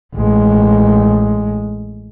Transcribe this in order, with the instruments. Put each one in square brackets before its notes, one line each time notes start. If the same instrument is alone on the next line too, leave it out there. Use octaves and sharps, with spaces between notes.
[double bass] A1 G#3